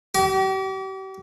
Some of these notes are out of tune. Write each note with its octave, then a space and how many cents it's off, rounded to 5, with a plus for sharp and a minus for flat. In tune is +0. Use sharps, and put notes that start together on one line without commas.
G4 -40